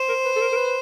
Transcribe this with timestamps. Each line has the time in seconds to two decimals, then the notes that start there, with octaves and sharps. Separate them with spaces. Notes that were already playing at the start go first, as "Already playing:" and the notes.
Already playing: C5
0.09 A#4
0.25 B4
0.36 A4
0.42 A#4
0.53 A#4
0.57 B4